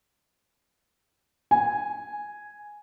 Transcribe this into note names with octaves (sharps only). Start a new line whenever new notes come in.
G#5